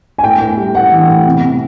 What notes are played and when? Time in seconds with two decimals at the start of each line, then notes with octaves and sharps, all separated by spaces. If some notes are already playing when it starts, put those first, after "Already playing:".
0.18 G#5
0.24 A2 G5
0.41 A2
0.57 G3
0.75 A2 F#5
0.91 E3
1.08 A2
1.26 C3
1.42 C3